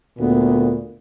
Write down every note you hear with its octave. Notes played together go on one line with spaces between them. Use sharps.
D2 A#2 B3